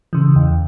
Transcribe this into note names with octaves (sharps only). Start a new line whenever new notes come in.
C#3 E3
E2